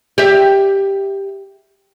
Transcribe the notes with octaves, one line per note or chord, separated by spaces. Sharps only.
G4 E5